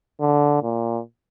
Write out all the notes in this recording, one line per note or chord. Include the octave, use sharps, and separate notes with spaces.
D3
A#2